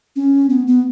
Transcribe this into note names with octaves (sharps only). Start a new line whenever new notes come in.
C#4
B3
B3